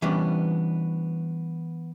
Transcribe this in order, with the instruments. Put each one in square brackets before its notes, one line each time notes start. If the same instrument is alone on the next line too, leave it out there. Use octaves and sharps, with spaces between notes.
[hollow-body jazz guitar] E3 G3 B3 C#4 D4